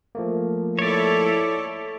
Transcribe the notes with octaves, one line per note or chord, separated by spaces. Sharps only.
F3 A3 A#3
E4 A4 C#5 D5